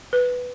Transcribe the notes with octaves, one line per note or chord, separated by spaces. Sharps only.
B4